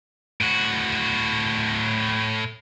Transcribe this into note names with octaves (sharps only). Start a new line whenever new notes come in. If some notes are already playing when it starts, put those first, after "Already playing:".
A2 F#4